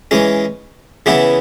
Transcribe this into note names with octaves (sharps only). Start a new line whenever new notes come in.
E3 G#3 C#4
C#3 E3 B3 E4